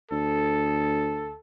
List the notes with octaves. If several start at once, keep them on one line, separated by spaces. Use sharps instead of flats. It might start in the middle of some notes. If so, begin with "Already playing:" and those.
D2 A4